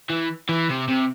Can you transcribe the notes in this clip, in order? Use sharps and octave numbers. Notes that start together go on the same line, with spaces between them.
E3
E3
C3
C3